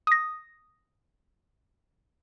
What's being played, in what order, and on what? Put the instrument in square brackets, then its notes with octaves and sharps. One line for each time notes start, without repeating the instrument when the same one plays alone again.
[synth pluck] D#6 A#6